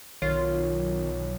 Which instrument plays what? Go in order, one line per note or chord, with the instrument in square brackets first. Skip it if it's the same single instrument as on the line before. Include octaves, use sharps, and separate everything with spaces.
[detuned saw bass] B1 [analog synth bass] D#3 [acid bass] F4 [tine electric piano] C#5